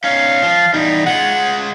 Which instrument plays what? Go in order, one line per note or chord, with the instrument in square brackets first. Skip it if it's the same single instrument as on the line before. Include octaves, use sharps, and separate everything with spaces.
[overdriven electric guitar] C#4 D#4 [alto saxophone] F5
[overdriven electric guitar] F3
[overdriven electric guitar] E2 G3 [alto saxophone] D#4
[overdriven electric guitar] G#3 F4 [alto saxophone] F#5